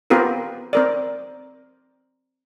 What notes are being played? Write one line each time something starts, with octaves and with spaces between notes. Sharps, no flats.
B3 C4 F4 G4 A#4
C4 A#4 D5